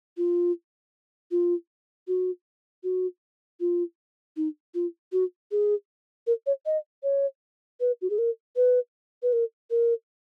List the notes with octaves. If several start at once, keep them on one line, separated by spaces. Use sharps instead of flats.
F4
F4
F#4
F#4
F4
D#4
F4
F#4
G#4
A#4
C#5
D#5
C#5
B4
F#4
G#4
A#4
B4
B4
A#4
A#4